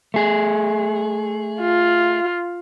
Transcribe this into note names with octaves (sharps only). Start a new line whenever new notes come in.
A3 G#4
F4